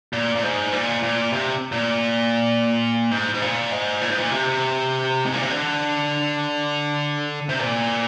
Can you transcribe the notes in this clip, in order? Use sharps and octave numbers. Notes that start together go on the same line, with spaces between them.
A#2
A#2
G#2
A#2
A#2
C3
A#2
G#2
G#2
A#2
G#2
A#2
G#2
A#2
C3
G#2
A#2
C3
D3
C3
A#2